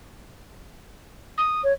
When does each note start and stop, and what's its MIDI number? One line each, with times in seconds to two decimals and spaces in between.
1.38 1.61 87
1.64 1.73 73